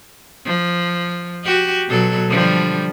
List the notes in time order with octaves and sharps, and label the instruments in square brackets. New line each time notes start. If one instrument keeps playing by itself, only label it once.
[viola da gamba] F3
F#4 G4
B2 F#3 A4
D3 F3 G3